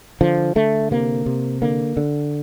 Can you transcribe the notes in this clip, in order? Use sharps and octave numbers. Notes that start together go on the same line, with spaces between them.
D3 F3
D3 A3
C3 A#3
C3
D3 A#3
D3